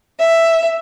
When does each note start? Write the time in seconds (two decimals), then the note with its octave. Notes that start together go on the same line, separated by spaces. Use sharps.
0.18 E5